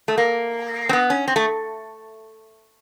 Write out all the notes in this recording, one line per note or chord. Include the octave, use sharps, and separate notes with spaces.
A3
A#3
C4
B3
C#4
C4
A3